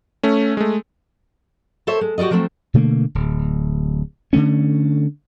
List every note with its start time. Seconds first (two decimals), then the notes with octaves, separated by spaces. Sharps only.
0.23 A3 C#4
0.57 G#3 A3
1.87 A4 C5 C#5 E5
2.01 G#3
2.18 F#4 G4 A#4 D5 D#5
2.31 F3 F#3 A3 A#3 C4
2.74 B2 D3 A3 A#3
3.15 D1
4.33 D3 D#3 A3 C#4